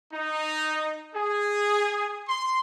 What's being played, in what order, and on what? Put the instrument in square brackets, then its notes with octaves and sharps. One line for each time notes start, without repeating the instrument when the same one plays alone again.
[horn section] D#4
G#4
C6